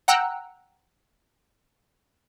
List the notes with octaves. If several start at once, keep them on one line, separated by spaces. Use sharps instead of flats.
F#5 G5 A#5 E6 F#6